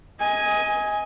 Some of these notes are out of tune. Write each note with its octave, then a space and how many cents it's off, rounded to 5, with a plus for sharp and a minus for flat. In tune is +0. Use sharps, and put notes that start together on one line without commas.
D#5 +25 G#5 +0